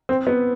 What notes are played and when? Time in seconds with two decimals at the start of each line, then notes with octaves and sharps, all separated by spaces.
0.09 C4
0.27 B3